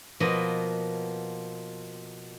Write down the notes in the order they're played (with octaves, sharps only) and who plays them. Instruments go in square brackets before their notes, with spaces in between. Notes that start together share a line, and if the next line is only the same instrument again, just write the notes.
[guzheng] B2 F3 A#3 D#5 B5